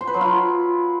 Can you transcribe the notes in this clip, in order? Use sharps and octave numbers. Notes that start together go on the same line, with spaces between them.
C5
B4
F#3
F4